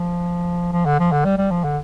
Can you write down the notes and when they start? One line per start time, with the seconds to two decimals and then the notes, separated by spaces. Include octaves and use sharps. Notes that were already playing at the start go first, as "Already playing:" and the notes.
Already playing: F3
0.73 F3
0.86 D3
0.99 F3
1.12 D3
1.25 G3
1.38 G3
1.51 F3
1.64 D3